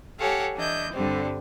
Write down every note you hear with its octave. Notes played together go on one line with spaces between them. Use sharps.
G4 A4 C#5 F5 F#5 G#5
E3 D4 E4 D#5 G6
G2 D3 G3 C4